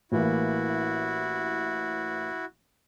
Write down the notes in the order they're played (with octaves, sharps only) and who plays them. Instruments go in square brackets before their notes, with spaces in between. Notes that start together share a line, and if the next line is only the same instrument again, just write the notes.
[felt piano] A1 E3 A#3 [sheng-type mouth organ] E4 F#4